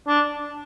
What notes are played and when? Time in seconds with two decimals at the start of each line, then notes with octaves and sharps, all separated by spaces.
0.07 D4